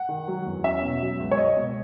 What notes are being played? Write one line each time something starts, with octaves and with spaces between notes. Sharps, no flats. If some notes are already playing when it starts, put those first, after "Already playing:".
Already playing: F#5
D#3
F#3
E2
C#4 E5
B2
F#3
C#2
C#5
C#2 D#5
B2